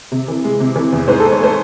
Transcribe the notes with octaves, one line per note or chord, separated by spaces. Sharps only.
C3
E3
G#3
C3
E3
E2
G#2 C5
G#2 A4
C#5
A3 C5